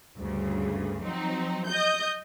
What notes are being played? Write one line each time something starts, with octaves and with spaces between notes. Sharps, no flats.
D2 G2 C#3
F3 F#3 C4 D#4
D#5 G6